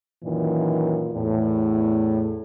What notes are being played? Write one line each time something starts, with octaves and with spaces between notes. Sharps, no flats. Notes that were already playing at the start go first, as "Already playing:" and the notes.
F#2 A#2 D#3 E3
E2 A2